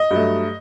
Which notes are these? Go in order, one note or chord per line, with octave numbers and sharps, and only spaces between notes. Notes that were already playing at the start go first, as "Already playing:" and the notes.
Already playing: D#5
G2 F#3 A3